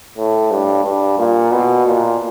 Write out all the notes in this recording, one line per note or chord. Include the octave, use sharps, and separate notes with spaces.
A2
G2
G2
A#2
B2
A#2